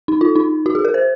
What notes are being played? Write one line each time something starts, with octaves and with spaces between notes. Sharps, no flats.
D#4
F4
D#4
F#4
G#4
A#4
C5